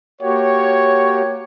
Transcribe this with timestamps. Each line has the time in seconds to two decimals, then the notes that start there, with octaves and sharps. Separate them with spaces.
0.22 A#3 F#4 G4 C#5